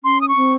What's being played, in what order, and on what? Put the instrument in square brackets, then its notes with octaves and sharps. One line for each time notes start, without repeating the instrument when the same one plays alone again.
[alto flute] C#4 [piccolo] C6
[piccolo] D#6
C#6
[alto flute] C4